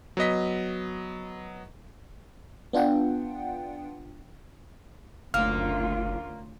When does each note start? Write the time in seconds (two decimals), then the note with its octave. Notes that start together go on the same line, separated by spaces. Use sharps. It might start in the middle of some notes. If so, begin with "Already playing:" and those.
0.17 F#3 B3 D#5 B6
2.73 B3 D4 F4 F#5 G5
5.34 F#1 D2 A#3 C#4 F4 F6